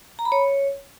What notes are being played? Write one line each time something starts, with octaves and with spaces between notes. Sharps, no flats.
A#5
B5
C#5